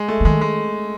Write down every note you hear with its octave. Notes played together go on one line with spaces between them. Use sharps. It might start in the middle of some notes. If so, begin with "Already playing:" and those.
Already playing: G#3
A3
D3
D#3 G#3
G#3